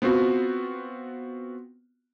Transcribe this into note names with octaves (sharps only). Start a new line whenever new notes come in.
B3 C4 F4 F#4